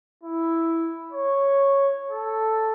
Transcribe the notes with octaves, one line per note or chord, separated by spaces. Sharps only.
E4
C#5
A4